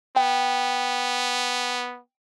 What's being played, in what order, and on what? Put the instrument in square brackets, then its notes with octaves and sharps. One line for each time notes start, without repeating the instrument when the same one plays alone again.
[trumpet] B3 [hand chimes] G5